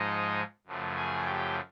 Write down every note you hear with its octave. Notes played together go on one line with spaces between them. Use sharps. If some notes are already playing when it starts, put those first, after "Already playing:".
Already playing: G#2 F3 G#3 D#4 D#5
F#2 C#3 F3 A3
G#4 G#5
G4 G5